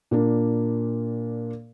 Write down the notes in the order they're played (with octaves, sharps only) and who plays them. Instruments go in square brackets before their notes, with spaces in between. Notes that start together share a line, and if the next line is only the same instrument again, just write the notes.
[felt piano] A#2 A#3 D4